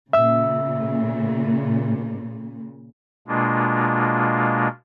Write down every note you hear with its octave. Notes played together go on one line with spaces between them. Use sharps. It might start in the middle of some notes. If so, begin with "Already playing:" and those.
A#2 C#3 E5 E6
B2 G#3 A#3 D4 F4